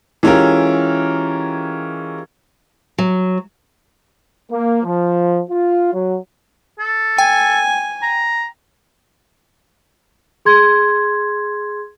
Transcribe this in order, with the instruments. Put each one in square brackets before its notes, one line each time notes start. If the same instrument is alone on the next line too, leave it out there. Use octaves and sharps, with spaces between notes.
[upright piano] E3 G#3 C#4 F4 G4 A#4
[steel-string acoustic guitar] F#3
[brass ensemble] A#3
F3
F4
F#3
[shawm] A4
[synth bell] G5 [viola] G#5
[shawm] A#5
[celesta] G#4 C6 G#6